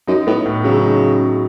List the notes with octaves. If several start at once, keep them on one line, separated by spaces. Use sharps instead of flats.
F#2 D#4
A2 B3
A2
C#3 F#3
D#4